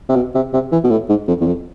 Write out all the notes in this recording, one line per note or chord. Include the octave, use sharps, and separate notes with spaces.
C3
B2
C3
C3
E3
B2
A2
G#2
F2
E2
F2